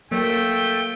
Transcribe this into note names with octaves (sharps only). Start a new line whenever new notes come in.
F#3 A3 A#3 G5